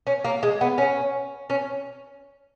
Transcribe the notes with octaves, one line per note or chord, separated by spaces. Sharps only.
C#4
A#3
G#3
B3
C#4
C#4